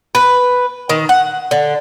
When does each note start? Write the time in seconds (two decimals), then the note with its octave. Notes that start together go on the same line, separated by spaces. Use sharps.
0.15 B4
0.89 D#3
1.09 F#5
1.51 D3